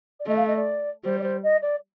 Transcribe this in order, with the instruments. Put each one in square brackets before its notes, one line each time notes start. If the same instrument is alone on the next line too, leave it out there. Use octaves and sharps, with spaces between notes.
[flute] D5
[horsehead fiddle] A3 [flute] D#5
[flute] F5
D#5
D5
[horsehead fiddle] G3 [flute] C5
[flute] D5
C5
D#5
D5